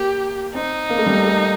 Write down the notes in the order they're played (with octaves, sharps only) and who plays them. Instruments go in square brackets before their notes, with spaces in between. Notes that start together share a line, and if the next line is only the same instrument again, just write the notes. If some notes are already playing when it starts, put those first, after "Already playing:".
Already playing: [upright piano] A#3 [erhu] G4
[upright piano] C4 [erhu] D#4
[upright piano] A#3
A3
G3
A#3
A3